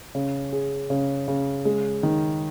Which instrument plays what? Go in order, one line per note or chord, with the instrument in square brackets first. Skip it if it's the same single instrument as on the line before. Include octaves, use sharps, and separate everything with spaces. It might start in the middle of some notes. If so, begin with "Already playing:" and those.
[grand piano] C#3
G#4
C#3
C#3
G#3
D#3